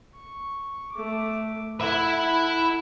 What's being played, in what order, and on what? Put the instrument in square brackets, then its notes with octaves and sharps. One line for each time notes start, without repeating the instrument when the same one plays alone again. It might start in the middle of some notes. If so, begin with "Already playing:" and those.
[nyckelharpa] C#6
A3 D6
[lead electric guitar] E4 E5 [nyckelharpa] A4 F#5